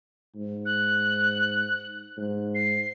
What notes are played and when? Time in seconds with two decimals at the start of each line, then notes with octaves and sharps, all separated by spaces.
0.35 G#2
0.66 F#6
2.17 G#2
2.55 C7